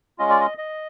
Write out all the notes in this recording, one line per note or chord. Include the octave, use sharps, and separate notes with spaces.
G#3 C#4 F4 D#5
D5
D#5
D#5